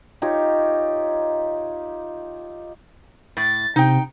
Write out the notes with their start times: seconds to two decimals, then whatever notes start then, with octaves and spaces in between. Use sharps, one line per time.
0.22 D#4 F4 G4 C#5
3.37 A2 A6
3.76 C3 D#4 G5